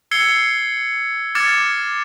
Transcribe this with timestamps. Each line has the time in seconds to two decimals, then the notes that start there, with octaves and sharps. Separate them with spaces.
0.11 E6 G#6 C7 C#7 G7
1.35 D6 F6 G#6 A6 C#7 E7